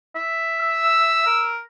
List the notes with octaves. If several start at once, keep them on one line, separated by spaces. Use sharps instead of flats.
E5
E6
A#4